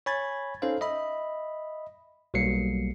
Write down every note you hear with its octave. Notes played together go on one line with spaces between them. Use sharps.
C#5 G#5 B5 G#6 A6
C#4 D#4 A4 C5 F5
D#5 E5 B5
B1 F#3 G3 A#3 C7 C#7